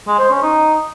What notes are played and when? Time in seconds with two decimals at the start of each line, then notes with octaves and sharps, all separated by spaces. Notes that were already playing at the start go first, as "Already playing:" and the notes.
0.07 G#3
0.19 C5
0.30 C#4
0.42 D#4